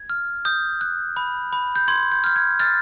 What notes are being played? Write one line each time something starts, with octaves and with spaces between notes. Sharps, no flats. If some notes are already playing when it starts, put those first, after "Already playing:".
Already playing: G#6
F6
D#6 G6
F#6
B5
B5
G6
C6 G#6
G6
F6 G6
G#6
F6 A6